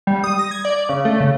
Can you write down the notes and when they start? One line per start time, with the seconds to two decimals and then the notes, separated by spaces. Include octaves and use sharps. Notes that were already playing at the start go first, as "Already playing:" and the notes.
0.07 G3
0.24 D#6
0.39 A#6
0.51 G#6
0.65 D5
0.89 C#3
1.05 A3
1.20 C#3